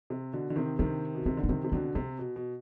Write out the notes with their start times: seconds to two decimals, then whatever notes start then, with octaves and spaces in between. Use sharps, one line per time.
0.10 C3
0.33 B2 D3
0.50 D3
0.56 C3 D#3
0.79 C3 D#3 D4
1.15 B2
1.26 C3 C4
1.37 D3
1.43 D4
1.49 C3 D#3 C4
1.64 C3
1.72 B2 D3 C4
1.95 C3 C4
2.19 B2
2.36 B2